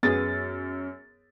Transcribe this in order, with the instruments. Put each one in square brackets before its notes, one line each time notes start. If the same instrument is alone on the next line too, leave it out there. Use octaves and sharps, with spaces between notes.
[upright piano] F#2 A6 [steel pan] B3 G#4